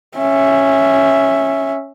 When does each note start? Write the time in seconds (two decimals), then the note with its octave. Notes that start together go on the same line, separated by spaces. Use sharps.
0.18 C#4 E5